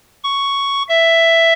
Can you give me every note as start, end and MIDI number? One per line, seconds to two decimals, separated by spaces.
0.24 0.83 85
0.89 1.53 76